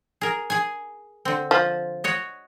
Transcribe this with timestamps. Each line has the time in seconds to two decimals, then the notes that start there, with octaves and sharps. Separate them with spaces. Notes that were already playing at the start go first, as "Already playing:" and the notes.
0.21 G#4 A#4
0.50 G#4 G#5
1.25 D3 C4
1.51 F3
2.04 F#4 C#5 D#5